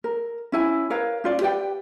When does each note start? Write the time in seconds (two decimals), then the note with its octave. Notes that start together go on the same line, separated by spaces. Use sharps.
0.04 A#4
0.52 C#4 E4 G#5
0.90 A#4 B4 C#5 F5
1.24 C#4 F4 D5
1.41 G4 B4 D5 G5